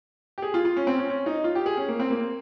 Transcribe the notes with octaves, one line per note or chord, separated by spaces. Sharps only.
G4
G#4
F4
F4
C#4
C4
C#4
C#4
D#4
F4
G4
G#4
C#4
A#3
C4
A#3